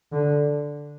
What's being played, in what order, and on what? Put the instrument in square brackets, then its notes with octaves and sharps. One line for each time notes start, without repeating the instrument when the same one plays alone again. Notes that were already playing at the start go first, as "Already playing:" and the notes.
[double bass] D3